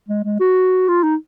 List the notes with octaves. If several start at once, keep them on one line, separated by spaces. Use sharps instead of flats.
G#3
G#3
F#4
F4
D#4